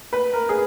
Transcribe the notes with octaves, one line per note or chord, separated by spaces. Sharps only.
B4
A#4
G#4